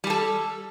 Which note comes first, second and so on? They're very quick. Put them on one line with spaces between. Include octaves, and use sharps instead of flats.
G3 G#4 A4